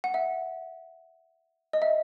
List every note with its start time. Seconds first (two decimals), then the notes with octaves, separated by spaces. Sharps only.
0.04 F#5
0.14 E5
1.73 D#5
1.82 E5